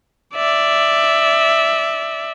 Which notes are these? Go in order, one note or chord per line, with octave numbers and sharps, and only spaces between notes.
D5 E5